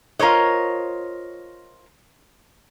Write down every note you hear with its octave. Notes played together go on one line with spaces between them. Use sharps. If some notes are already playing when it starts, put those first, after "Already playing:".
F4 A#4 C5 C#5 D#5